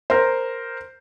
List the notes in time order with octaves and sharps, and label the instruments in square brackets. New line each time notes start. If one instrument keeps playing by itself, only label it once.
[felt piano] A#4 C5